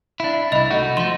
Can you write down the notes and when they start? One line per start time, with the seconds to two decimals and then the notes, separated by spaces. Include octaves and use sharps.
0.20 D4 E4
0.52 C2 E4 D#5 B5
0.71 A3 D#4 F#4
0.97 F3 D#4 C6 G7